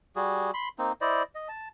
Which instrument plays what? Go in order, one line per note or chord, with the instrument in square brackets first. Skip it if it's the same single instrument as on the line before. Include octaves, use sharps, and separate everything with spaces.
[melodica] G3 F#4 G#4
B5 C6
A#3 C4 D#4
E4 C5 D5 D#5
D#5
A5